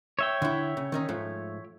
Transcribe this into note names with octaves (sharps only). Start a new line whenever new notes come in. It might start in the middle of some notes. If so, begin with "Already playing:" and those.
C#5 E5 G5
D3 E4
C#3
D#3 C#4 D#4
G#2 F3 A3